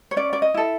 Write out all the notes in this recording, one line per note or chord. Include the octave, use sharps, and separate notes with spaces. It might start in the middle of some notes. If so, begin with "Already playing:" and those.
C#5
C#4 D5
D5
D#5
E4 A4